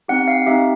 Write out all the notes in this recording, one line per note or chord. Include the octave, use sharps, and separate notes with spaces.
C4 D#4 G4 F#5
F5
C4 D#4 G4 E5